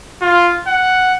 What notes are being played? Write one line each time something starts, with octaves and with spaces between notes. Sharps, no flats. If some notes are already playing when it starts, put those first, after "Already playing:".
F4
F#5